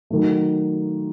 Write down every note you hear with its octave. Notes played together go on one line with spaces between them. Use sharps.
D#3 F#3 A3